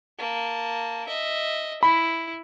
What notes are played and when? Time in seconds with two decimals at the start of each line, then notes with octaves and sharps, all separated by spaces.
0.18 A#3 A5
1.08 D#5 E5
1.83 E4 B5